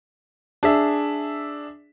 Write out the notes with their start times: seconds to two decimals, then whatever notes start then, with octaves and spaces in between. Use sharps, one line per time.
0.63 D4 G#4 E5